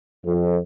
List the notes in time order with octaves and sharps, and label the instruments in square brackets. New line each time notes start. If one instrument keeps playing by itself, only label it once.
[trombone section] F2